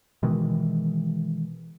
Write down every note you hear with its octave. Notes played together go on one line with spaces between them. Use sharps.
B2 D#3 E3 G#3